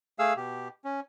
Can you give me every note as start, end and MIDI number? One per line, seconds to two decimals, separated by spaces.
0.19 0.34 57
0.19 0.34 68
0.19 0.34 77
0.19 0.34 88
0.36 0.68 47
0.36 0.68 67
0.85 1.00 61